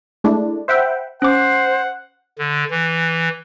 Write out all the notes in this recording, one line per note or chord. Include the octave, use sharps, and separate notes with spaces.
G#3 A3 D4 E4
C5 E5 F#5 G5 B5
C#4 C5 F#5 D6
D3
E3